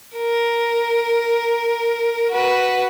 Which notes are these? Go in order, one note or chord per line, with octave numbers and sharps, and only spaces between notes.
A#4
F#4 B4